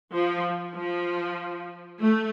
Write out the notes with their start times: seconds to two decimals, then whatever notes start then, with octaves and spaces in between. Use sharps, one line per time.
0.13 F3
0.75 F3
2.00 A3